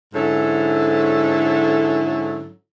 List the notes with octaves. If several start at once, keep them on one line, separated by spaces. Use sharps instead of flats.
G#2 D3 F#3 C#4 E4 A4